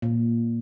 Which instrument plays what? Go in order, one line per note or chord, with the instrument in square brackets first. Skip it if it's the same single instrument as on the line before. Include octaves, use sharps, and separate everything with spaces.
[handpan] A#2